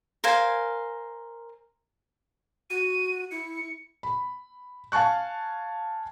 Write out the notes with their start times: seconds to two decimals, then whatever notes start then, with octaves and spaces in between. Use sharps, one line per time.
0.24 A#4 C5 F5 G#5
2.70 F#4 D#7
3.31 E4 C#7
4.03 B5
4.92 F5 G#5 A5 C#6 F#6